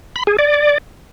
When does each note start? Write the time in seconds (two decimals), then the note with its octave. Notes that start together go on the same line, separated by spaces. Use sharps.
0.16 B5
0.27 G#4
0.39 D5